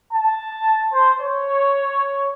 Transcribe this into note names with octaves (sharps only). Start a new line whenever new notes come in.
A5
C5
C#5